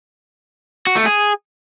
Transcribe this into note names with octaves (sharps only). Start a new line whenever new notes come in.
F#4
A3
G#4